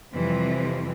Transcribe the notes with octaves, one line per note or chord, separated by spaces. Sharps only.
F2 C3 E3 F3 G3 C4